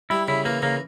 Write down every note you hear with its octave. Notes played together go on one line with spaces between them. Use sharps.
G3 E4
C#3 E4
E3 A#3
C#3 A#3